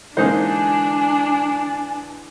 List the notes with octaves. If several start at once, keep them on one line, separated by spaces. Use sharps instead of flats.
D3 E3 G#3 A#3 D4 D#4 C5 G#5